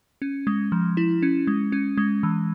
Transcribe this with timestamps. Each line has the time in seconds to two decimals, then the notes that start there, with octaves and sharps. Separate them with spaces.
0.22 C#4
0.47 G#3
0.72 F3
0.97 E4
1.23 C#4
1.47 G#3
1.72 C#4
1.97 G#3
2.23 E3